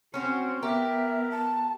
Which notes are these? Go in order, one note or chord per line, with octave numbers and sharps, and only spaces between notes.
C4 C#4 F#4 C5
B3 G4 A#4 E5
A5